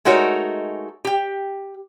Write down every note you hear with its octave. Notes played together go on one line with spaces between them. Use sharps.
G#3 A3 D#4 F#4 A#4 C#5
G4 G5